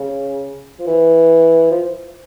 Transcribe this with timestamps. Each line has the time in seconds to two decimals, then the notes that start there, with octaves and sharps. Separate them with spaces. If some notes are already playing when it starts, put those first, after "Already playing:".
Already playing: C#3
0.79 F3
0.87 E3
1.71 F3